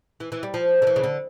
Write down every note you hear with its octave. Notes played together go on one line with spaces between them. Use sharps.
E3
E3
G3
F3
D3
E3
C#3
D3